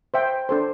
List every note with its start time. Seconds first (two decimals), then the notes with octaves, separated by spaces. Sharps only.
0.14 C5 E5 G5
0.49 D4 A4 C5